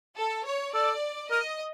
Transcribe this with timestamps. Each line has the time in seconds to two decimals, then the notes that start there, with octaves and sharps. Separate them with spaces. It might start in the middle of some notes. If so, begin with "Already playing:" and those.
0.17 A4
0.46 C#5
0.74 A4 D5
1.31 A#4 D#5